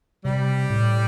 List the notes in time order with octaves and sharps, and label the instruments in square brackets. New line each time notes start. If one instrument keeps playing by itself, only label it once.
[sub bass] C3 [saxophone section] G3
[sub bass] A2